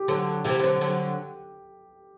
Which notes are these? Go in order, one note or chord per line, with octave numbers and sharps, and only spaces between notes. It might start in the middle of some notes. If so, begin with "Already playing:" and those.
Already playing: G4
D3 F#3 A4
C3 E3 G4
E3
D3 F#3
D3 F#3